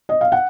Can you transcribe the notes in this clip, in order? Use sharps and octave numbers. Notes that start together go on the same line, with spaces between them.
D#5
F5
F#5